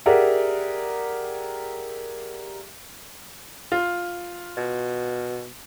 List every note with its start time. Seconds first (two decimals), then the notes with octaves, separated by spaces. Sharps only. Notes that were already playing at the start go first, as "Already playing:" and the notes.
0.06 G4 G#4 A#4 D5 E5 F#5
3.72 F4
4.57 B2